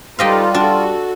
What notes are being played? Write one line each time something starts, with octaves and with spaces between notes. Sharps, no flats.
G3 D#4 F4 G4 A4 B4 D#5 F5
D4 F#4 A4